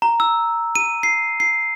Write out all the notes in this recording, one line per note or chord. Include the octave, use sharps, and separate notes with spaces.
A#5
E6
D#7
C7
C7